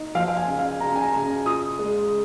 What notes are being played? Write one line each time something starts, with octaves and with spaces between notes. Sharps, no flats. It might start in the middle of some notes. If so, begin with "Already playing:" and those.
Already playing: D#4
F3 F5
F5
G#5
C#3
F5
C#3 A#5
G#5
A#5
C#3
F4 D#6
G#3